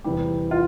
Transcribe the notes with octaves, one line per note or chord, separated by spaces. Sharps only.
E2 C3 E3 G3 G4
F4